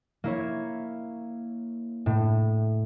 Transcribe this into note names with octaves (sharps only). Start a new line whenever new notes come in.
A#3 E4 C#5
A2